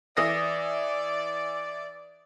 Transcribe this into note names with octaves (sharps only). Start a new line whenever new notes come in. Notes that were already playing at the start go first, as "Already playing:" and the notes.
E3 D5 D#6 A#6